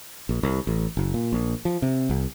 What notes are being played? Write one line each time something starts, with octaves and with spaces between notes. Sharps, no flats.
A#1
C2
A1
F#1
A#2
A#1
F3
C3
C2